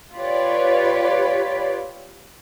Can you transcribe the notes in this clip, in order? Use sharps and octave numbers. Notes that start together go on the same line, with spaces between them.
F4 G4 B4 C#5 D5